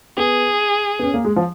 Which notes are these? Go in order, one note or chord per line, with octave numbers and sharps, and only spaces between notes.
B3 G#4
B3
C#4
A#3
G#3
F3